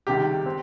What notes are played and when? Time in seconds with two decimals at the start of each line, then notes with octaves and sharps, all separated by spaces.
0.07 C#2 C3 D#3 G3 G4
0.46 C4